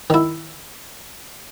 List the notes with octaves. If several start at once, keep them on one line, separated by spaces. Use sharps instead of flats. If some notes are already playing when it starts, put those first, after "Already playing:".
D#3 E4